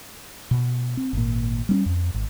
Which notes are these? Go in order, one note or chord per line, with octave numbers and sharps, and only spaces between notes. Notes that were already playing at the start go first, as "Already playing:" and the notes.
B2
C4
G#1 A#2
G3 C4 C#4
F2
G#1